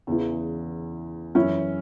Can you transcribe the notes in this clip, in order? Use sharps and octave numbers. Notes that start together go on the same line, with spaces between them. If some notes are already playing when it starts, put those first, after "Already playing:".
E2 C#3 E3
F#2 E3 C#4 E4